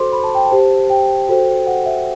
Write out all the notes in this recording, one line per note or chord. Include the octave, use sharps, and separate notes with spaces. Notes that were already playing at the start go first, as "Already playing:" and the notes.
Already playing: F#4 A4 C5 C6 D6
B5
A5
G5
A5
G4 C5
G5
F#4 A4 C5
F#5
E5